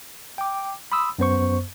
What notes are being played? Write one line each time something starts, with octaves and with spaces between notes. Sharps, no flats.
G5 D6
B5 C6 D#6 E6
F#2 B3 C5 C#6